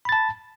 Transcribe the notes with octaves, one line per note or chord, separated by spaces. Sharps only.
A5 B5 A6